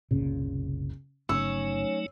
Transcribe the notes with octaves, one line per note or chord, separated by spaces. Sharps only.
F#1 C2 A#2 C#3
G1 C#3 F#3 A3 C#4 D#4 C#5 E6